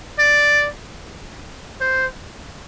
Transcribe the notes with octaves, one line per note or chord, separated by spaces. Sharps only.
D5
C5